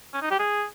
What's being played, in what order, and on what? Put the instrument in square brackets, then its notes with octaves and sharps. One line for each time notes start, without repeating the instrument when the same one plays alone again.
[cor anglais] C#4
D#4
G4
G#4